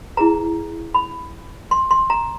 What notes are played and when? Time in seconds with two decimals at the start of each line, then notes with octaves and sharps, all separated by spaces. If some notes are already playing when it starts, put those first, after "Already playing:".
0.17 E4 G#4 B4 A#5
0.94 B5
1.71 C6
1.91 C6
2.10 A#5